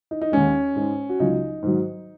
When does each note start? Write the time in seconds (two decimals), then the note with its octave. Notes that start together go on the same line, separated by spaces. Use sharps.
0.11 D#4
0.21 D#4
0.32 D#2 D#3 G#3 C#4
0.75 G#2 G#3
1.09 F#4
1.20 C#2 C#3 F#3 D#4
1.63 G#2 D#3 F#3